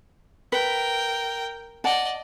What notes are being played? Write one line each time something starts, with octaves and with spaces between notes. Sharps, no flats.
A#4 B4 G5
D5 D#5 F#5 A5